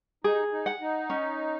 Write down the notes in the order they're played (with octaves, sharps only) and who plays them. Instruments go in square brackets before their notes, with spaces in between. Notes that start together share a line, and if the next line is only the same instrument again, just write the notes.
[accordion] D#4 [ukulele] G#4
[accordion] D#4
[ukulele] F#5
[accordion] D#4
[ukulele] C#4